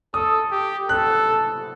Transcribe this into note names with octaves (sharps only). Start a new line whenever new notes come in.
A4 D#6
G4
A4 F#6